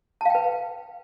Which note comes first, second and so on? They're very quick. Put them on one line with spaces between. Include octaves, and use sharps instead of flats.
A5 F5 G5 B4